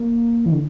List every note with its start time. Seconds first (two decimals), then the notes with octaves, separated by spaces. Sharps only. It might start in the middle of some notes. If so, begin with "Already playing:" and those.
Already playing: A#3
0.46 E3
0.52 D3